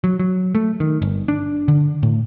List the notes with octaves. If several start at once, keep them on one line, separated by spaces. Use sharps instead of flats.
F#3
F#3
A3
D#3
G1
D4
D3
A2